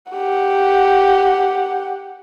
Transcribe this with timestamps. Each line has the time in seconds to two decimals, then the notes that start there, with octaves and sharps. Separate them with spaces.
0.12 G4 F#5